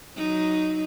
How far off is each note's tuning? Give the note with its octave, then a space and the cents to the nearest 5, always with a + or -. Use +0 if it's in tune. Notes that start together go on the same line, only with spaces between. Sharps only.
F#3 +0 D#4 +0